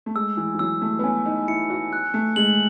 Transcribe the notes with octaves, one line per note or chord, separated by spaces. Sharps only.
A3
G#3 E6
E3
E3
F#3 E6
A3
B3
C#4 G#5
D#4
E4 C#7
F#4
F#6
A3
G#3 F#7